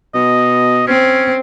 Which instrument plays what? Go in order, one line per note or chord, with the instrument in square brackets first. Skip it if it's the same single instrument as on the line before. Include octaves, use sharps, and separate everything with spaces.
[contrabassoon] B2 [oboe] D#5
[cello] C4 [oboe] C#4